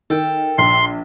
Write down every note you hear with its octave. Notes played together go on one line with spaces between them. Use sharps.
D#3 A4 G5
A#1 C6